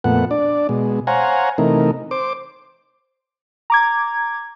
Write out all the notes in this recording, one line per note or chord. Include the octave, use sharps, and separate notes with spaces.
F2 A#2 A3 B3 F#5
D4 D5
B2 G#3
C5 C#5 F5 F#5 G#5 A#5
C3 E3 A3 D#4 A#4
C5 D6
A#5 D6 G#6